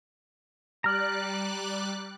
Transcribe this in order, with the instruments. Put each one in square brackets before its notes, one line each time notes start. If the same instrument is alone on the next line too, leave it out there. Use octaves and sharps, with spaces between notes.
[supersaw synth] G3 D5 F#6 [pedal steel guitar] A#5 F6